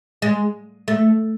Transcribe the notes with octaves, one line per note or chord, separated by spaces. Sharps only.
G#3
A3